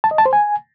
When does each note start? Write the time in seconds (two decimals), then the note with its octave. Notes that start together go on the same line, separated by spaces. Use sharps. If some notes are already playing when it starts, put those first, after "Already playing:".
0.04 A5
0.11 D#5
0.18 A5
0.26 C5
0.33 G#5